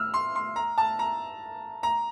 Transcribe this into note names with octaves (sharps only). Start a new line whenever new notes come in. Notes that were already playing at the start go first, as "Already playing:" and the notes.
Already playing: E6 F6
C6
C6
A#5
A5
A#5
A#5